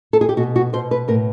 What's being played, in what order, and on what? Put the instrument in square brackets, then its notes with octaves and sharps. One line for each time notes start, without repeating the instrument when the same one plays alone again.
[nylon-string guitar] A4
G#4
G4
B2 F#4
F#4
B2 C5
B4
A2 A#4